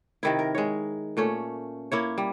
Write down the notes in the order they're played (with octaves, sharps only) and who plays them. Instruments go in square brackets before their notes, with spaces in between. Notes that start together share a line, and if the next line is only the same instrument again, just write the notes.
[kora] C3 D#3 E4
A#4
G#3 C#5
A#2 A3 C#4
A#3 E4 C#5
G3